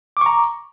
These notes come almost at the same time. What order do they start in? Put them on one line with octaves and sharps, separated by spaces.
D6 C#6 A#5